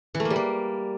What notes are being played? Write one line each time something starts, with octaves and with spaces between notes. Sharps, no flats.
E3
A3
A#3
G3
A#3